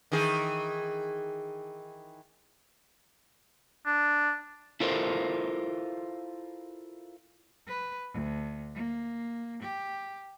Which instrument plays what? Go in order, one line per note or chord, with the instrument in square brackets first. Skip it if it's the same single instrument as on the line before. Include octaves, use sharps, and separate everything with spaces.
[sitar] D#3 E3 G#4
[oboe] D4
[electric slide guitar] E4 F4 A4 A#4 C5
[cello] B4
D2
A#3
G4